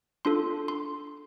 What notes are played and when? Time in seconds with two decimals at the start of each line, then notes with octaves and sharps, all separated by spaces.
0.25 D4 F4 A4 C6
0.68 C6